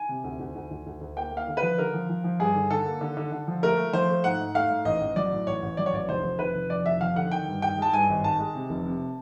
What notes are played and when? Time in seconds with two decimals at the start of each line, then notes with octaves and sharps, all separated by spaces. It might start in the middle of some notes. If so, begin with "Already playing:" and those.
Already playing: G#5
0.09 C3
0.24 D2
0.40 D2
0.55 D2
0.71 D2
0.86 D2
1.01 D2
1.17 A#3 G5
1.31 A#3
1.37 F5
1.48 D3
1.57 B4
1.63 F3
1.78 D3 A#4
1.94 F3
2.09 F3
2.24 F3
2.40 G2 G#4
2.55 D3
2.70 D3 A4
2.86 A#3
3.01 D3
3.17 D3
3.32 D3
3.47 F3
3.63 A3 A#4
3.78 A3
3.93 F3 C5
4.09 A3
4.24 G#2 F#5
4.39 G#2
4.54 A3 F5
4.70 G#2
4.85 A1 D#5
5.01 A1
5.16 F#3 D5
5.32 A2
5.47 A1 C#5
5.62 A1
5.77 F#3 D5
5.86 C#5
5.93 A1 D5
6.08 F1 C5
6.24 F1
6.39 F1 B4
6.55 F1
6.70 F2 D5
6.86 F1 E5
7.01 F2 F5
7.16 D3 F#5
7.31 D#3 G5
7.47 G2
7.62 D#3 G5
7.78 G#3 A5
7.93 G2 G#5
8.09 G#1
8.24 D#3 A5
8.39 G#3
8.54 C3
8.70 F1
8.86 C3